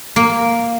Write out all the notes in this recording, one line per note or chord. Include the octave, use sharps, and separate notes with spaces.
A#3